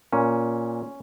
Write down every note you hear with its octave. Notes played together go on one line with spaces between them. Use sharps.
A#2 C#4